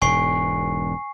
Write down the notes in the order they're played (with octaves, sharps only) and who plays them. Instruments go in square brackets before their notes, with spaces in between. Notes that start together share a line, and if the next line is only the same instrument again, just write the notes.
[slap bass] E1 G#2 B2 [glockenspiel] G#5 C#6 C7